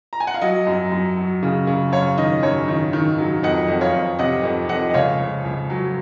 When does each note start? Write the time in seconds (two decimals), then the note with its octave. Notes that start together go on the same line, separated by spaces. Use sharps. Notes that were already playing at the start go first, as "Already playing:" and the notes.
0.13 A#5
0.20 G#5
0.27 F#5
0.34 F5
0.41 F#3 D#5
0.67 F#2
0.92 F#2
1.17 F#3
1.43 C#3
1.67 C#3
1.92 F#2 C#5 F5
2.18 D#3 D#5
2.43 F#2 C#5
2.68 D#3
2.93 D#3
3.18 F#3
3.43 F2 D#5 F#5
3.68 F2
3.81 C#5 F5
3.93 F2
4.19 C3 D#5 F#5
4.43 F2
4.69 F2 D#5 F#5
4.90 D#5
4.94 C#2 C#5 F5
5.19 C#2
5.45 C#2
5.70 F#3